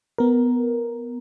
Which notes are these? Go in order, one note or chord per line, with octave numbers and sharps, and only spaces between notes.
B3 A#4